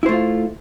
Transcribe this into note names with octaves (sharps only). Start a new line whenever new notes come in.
A3 E4 F4 C5